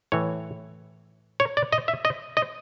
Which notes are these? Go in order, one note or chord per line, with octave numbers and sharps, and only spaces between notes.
A2 E3 C#5
C#5
D5
D#5
E5
D#5
D#5